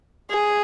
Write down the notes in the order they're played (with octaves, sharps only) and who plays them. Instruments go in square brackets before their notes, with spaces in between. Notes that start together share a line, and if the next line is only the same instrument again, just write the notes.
[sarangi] G#4